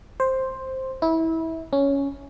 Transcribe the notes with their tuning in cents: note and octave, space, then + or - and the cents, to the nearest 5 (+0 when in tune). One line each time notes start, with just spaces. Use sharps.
C5 +5
E4 -25
C#4 +5